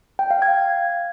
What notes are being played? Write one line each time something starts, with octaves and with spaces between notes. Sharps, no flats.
G5
F5
G#6